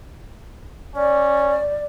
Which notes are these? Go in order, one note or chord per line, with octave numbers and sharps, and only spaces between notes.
C#4 D5